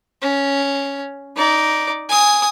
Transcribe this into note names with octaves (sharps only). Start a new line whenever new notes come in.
C#4
D#4 D5
G#5 D#6